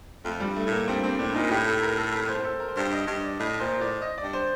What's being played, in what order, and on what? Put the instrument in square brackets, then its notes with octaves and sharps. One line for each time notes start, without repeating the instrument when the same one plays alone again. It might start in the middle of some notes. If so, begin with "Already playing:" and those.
[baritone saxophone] F2 [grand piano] A3
[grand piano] G3
[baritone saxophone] G2
[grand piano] A3
[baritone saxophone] A2
[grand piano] A#3
[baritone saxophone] G2 [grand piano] C4
[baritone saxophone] G2 [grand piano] C4
[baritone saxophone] A2 [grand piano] D4
[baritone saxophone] A#2 [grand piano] D#4
[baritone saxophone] A2 [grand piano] G4
[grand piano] A4
A#4
A4
A#4
C5
A4
A#4
C5
[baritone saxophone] G2 [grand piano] D5
[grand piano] D#5
[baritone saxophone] G2 [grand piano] D#5
[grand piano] D5
[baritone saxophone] A2 [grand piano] D#5
[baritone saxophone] A#2 [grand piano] C5
[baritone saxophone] A2 [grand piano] D5
[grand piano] D#5
D5
[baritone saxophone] G2
[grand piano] C5